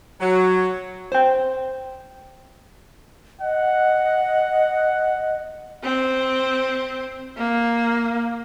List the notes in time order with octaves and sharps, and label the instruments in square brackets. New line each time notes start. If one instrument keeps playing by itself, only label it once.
[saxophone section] F#3
[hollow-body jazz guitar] C5 G5
[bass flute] D#5 [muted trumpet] F#5
[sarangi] C4
A#3